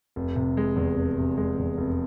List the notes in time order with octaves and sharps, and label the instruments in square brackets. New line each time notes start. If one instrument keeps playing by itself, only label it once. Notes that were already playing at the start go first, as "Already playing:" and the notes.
[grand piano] F1
C3
G#3
E2
F1
C3
G#3
E2
F1